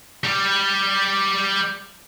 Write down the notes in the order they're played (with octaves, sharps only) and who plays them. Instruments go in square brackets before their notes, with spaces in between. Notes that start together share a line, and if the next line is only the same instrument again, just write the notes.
[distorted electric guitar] G3 G4